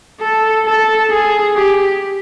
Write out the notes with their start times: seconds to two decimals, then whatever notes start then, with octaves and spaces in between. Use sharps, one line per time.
0.21 A4
0.66 A4
1.11 G#4
1.56 G4